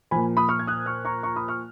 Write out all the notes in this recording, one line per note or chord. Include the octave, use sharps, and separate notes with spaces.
A#2 F3 G#5 B5
B5 D#6
C#6 F6
G#6
D#6 F#6
C#6 F6
A#5 C#6
A#5 C#6
B5 D#6
C#6 F6